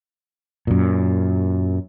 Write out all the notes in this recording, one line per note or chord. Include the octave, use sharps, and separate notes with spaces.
F#2 A#2